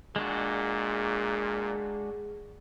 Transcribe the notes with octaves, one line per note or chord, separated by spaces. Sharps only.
A#2 G#3 D4 F#4 G#4